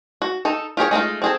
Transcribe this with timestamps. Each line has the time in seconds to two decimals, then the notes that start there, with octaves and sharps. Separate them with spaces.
0.22 F#4
0.45 D#4 A4
0.77 F4 G4 G#4 C#5
0.91 G#3 A3 D#4 F4
1.22 C4 G#4 A4